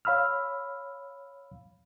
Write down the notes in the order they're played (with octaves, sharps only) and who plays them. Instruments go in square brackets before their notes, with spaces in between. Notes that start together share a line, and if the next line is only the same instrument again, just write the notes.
[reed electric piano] C#5 F5 B5 E6 F6